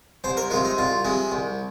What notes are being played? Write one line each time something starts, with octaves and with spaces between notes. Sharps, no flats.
C2 C5
A#4
C3 G#3 F4
D#4
C2 F4
C3 G#3
C2